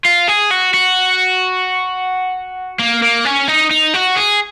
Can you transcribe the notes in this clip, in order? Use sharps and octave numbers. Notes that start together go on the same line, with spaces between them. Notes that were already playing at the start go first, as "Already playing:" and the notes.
F4
G#4
F#4
F#4
A#3
A#3
C#4
D#4
D#4
F#4
G#4